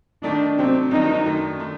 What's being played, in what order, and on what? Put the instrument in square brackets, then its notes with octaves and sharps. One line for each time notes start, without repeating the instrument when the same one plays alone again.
[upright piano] D#3 A3 D#4 [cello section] D4
[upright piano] C3 F#3 A3 D4 [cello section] C4
[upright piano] G2 D#3 F#3 A#3 D4 [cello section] D#4
[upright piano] F#2 D#3 A3 D4
D#3 A3 D4